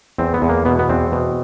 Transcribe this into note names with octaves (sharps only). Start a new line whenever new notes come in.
E2 C4
B3
E2
A#3
B2 B3
B3
E2 C4
B2